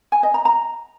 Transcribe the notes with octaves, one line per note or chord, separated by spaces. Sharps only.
G#5
D#5
A#5
A#5